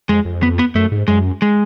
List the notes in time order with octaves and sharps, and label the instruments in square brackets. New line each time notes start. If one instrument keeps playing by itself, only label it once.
[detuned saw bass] F2 [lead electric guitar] G#3
[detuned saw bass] F2
[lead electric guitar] B3
B3
[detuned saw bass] F#2 [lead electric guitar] A3
[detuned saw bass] G#2
[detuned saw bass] F#2 [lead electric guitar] G#3
[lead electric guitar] G#3